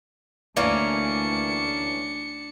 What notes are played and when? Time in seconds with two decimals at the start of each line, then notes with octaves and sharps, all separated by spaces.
0.57 D2 E3 A#3 C#4 D4 D5 C#7